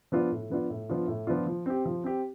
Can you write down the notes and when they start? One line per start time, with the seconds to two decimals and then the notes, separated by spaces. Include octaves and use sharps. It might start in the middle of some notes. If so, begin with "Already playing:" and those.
0.12 F3 B3 D4 F4
0.31 A2
0.50 F3 B3 D4 F4
0.70 A2
0.89 F3 B3 D4 F4
1.08 A2
1.27 F3 B3 D4 F4
1.47 F3
1.66 C4 G4
1.85 F3
2.04 C4 G4